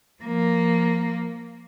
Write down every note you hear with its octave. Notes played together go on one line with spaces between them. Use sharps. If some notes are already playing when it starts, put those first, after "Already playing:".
F3 A#3